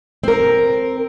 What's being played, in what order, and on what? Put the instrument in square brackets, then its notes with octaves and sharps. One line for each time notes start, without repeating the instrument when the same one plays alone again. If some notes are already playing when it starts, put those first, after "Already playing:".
[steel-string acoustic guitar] C4 A#4